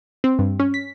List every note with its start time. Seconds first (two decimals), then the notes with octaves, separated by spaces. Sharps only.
0.24 C4
0.39 G2
0.60 C#4
0.74 B6